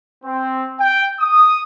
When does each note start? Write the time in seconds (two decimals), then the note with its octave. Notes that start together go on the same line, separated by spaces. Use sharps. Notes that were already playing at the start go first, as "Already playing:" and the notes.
0.24 C4
0.80 G5
1.19 D#6